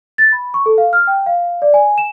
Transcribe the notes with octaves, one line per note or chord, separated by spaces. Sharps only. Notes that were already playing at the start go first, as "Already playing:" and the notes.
A6
B5
C#6
A4
F5
F6
G5
F5
D5
G#5
E7